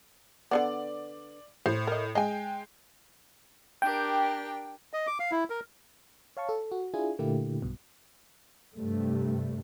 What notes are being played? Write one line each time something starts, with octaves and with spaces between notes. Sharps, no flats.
D3 F3 B3 D5
A2 C5
A#4 D#5
G#3 D#5 G5 G#5
D4 G4 A#4 G5
D#5
D6
F5
E4
A#4
C#5 F5 A5 C#6
A4
F#4
D4 E4 F4 G#4 G#5
A#2 D3 A3 A#3 E4 G4
B1 G2 B2
G2 C3 A3